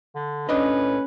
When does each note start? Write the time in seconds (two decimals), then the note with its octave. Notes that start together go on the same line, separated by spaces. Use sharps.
0.15 D3
0.49 A2 C#4 D4 B4 D#5